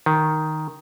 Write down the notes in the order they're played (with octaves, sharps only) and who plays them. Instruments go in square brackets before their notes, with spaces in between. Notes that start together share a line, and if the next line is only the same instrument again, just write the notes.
[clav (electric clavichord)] D#3